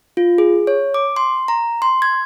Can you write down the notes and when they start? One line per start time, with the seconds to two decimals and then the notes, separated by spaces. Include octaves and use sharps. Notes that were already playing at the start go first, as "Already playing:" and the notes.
0.17 F4
0.38 G#4
0.67 C#5
0.94 D6
1.16 C6
1.48 A#5
1.82 C6
2.02 G#6